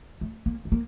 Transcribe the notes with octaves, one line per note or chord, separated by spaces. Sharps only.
A3
A#3
A3
A#3